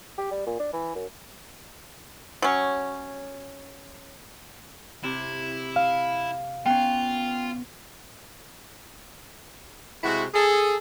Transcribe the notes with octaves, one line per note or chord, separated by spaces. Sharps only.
G4
G3
A#2
D4
E3
F#2
F#3 C#4
C3 E4
F5
B3 C#4 F4 G5
C3 G#3 E4 F#4
G#4 A4